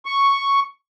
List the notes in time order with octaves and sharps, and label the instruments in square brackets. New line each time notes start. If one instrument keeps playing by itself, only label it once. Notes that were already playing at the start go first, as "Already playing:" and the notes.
[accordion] C#6